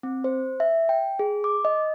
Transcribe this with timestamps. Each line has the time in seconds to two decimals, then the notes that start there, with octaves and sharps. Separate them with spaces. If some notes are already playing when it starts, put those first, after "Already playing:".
0.03 C4
0.24 C5
0.60 E5
0.89 G5
1.19 G#4
1.44 D6
1.65 D#5